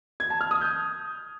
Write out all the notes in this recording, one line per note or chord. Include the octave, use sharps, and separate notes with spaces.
G#6
A5
F6
D#6
G6